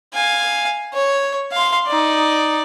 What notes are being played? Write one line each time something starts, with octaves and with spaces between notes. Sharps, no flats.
F5 G#5
C#5
F5 C6
D#4 D5